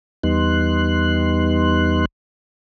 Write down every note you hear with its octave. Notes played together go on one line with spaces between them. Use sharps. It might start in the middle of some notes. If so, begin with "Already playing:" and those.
E2 G3 B3 D#4 C6 F#6